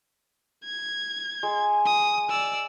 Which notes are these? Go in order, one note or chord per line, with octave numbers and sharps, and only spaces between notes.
G#6
G#3
D#6
D5 E6